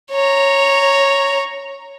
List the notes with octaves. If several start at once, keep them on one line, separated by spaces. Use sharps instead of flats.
C#5 A#5